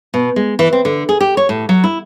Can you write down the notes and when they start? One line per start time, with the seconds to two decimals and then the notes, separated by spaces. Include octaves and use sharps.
0.14 B2
0.36 G#3
0.59 E3
0.73 C4
0.85 D3
1.09 G#4
1.21 G4
1.37 C#5
1.49 A2
1.69 F#3
1.84 E4